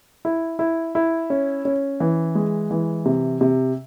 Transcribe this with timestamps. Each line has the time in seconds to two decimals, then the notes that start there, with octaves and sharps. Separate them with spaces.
0.25 E4
0.59 E4
0.95 E4
1.30 C#4
1.65 C#4
2.00 E3
2.35 G#3
2.71 E3
3.05 C3
3.41 C3